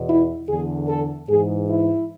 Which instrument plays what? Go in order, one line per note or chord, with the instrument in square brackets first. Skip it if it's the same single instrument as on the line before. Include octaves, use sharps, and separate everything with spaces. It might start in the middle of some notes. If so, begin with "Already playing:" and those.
Already playing: [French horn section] E2 B2
E4
E2 D3 G#4
A4
G#2 E3 G#4
E4